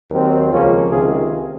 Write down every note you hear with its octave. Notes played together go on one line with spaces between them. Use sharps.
D#2 D#3 F#3 C4
C#2 C#3 F3 A#3 C#4 F4
C#2 C3 D#3 G#3 F4 G#4